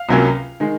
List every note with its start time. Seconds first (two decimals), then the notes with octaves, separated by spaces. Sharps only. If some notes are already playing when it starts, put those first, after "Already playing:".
Already playing: F5
0.09 C#2 C3 F#3 A#3 C#4
0.60 D#3 G#3